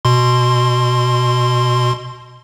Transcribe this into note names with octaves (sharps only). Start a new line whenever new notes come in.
B2 C6